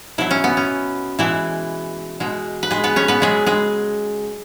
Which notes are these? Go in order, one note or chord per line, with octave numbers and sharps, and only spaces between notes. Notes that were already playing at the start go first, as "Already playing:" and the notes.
B2 F#3 E4
C#4
B3
C#4
B2 E3 G#3 E4
B2 G#3
B4
G#3 G#4
B3 B4
C#4 C#5
B3 B4
C#3 F#3 G#3 G#4
G#3 G#4